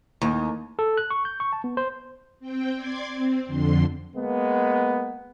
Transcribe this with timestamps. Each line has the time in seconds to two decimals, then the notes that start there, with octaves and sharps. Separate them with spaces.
0.21 D#2
0.79 A4
0.97 F#6
1.10 C#6
1.25 G6
1.40 C#6
1.53 A5
1.64 B3
1.77 C5
2.40 C4 G5
2.76 D5 C6 D6 G#6
3.08 C4
3.46 F2 D3 C6
4.16 G#3 A#3 B3